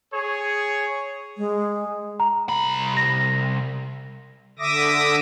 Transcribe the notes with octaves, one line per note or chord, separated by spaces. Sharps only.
G#4 C#5
G#3
A#5
C2 B5
A#6
D3 E5 D6 D#6 A#6